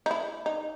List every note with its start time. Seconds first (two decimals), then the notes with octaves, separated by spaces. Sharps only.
0.06 D#4
0.11 E4
0.46 D#4